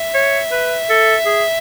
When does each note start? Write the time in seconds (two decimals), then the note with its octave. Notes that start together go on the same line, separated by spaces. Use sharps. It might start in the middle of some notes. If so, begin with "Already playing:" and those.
Already playing: E5
0.14 C#5
0.51 B4
0.90 A4
1.26 G#4